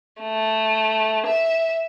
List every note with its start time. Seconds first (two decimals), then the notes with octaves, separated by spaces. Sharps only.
0.22 A3
1.27 E5